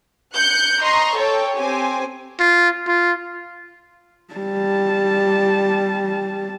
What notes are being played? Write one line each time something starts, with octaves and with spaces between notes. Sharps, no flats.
F#6 G6 C#7
D#5 A#5 C6 C#6
A4 C#5 G5
C4 G4 G#5
F4
F4
G3 A5